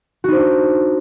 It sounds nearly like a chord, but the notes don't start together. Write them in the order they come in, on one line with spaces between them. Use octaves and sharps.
F#4 D#4 C5 D4